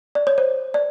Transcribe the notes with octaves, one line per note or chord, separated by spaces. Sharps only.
D5
C#5
C5
D5